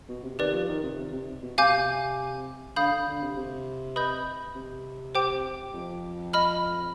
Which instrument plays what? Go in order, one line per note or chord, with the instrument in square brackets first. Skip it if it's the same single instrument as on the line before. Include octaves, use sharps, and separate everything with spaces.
[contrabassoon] B2
C3
[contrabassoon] D#3 [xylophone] G4 B4 D5
[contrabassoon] F3
D#3
C3
C3
B2
[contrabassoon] C3 [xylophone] F5 G#5 D6 G6
[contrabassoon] D3 [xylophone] F5 B5 D#6 G6
[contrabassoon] D3
D3
C3
C3
[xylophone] B4 D#5 B5 D#6 G6
[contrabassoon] C3
[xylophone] G4 C5 G5 D6
[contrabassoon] F2
[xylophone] D#5 B5 F6